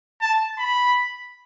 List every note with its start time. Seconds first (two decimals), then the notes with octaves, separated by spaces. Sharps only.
0.21 A5
0.58 B5